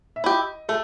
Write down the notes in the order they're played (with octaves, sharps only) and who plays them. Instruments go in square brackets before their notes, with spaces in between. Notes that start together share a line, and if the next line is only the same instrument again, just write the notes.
[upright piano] E5
[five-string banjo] E4 G4 [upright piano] D#5
[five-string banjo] A3 [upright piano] A4